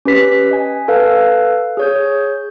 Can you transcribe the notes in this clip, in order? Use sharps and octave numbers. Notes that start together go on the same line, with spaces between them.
C#4 G4 B4 B6
D#5 G#5
A4 B4 F5
G#4 C#5 G6